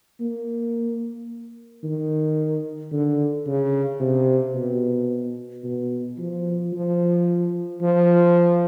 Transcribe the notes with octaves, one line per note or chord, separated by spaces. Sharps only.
A#3
D#3
D3
C#3
C3
B2
B2
F3
F3
F3